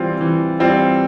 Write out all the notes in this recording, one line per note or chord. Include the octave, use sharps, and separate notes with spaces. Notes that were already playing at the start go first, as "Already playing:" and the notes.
Already playing: E3 G3 C4 F4
E3
G3 C4 F4